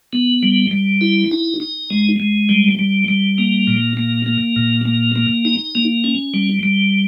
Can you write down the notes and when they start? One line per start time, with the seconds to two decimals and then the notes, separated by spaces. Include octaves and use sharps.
0.13 B3
0.43 G3
0.71 G3
1.01 E4
1.31 D#4
1.60 D#4
1.90 G#3
2.20 G#3
2.49 G3
2.79 G3
3.08 G3
3.38 A#3
3.67 A#2
3.97 A#3
4.26 A#3
4.56 A#2
4.85 A#3
5.16 A#3
5.45 D#4
5.75 A#3
6.04 C#4
6.34 G3
6.63 G3